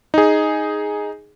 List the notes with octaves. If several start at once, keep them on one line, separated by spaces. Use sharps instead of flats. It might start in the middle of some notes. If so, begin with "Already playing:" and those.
D#4 G#4